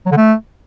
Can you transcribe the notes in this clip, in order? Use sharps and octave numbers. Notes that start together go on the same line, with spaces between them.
F#3
D3
A3